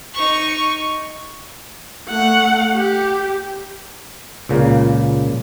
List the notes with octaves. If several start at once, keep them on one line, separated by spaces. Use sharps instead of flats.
D#4 C#6
A3 F#5
G4
C#2 A#2 C#3 A#3